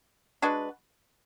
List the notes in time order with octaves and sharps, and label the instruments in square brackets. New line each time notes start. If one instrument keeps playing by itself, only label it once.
[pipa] G#3 D4 F#4 B4